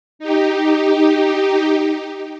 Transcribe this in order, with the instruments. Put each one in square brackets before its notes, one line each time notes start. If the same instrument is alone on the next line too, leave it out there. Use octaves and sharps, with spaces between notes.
[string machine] D#4 G4